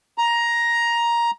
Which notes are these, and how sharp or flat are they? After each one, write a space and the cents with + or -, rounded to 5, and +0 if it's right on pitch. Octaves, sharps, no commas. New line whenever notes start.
A#5 +10